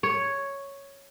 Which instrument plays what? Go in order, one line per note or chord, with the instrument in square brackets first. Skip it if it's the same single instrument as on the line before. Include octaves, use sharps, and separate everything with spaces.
[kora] C#5